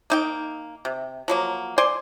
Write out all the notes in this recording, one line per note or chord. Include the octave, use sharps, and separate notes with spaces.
A#3 D#4 G5
C3
F3 F#3 A#3
C5 D5 G#5 C6